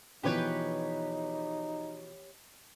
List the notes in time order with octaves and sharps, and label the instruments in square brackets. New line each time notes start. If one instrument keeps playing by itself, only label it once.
[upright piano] B2 E3 F3 [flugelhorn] D#4 [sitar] G4 B4 C#5